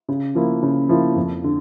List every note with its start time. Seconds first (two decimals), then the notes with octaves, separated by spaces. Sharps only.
0.09 C#3
0.35 F3 A#3 E4
0.63 C#3
0.89 F3 A#3 E4
1.16 F2
1.44 D3